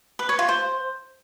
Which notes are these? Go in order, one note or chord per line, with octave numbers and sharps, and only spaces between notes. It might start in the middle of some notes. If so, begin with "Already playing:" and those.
B4
C#5
F4
C5